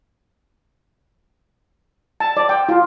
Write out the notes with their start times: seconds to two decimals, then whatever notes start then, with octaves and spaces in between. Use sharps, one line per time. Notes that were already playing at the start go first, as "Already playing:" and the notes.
2.20 A5
2.37 D5
2.49 G5
2.69 F4